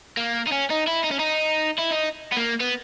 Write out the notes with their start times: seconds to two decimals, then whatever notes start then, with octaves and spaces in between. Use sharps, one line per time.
0.17 A#3
0.47 D#4
0.52 C#4
0.70 D#4
0.87 E4
1.04 D#4
1.11 C#4
1.19 D#4
1.78 E4
1.91 D#4
2.32 B3
2.37 A#3
2.60 B3